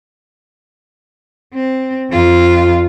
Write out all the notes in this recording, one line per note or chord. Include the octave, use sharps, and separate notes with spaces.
C4
F2 F4